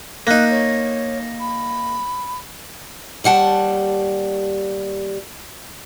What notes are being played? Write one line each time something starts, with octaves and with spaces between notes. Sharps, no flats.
A#3 D#4 F#6
C#5
B5
D#2 G3 F#5 A5